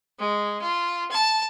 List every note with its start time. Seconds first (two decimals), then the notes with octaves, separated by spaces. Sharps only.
0.19 G#3
0.61 F4
1.11 A5